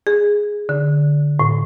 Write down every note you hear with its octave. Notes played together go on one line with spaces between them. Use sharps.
G#4
D3
A2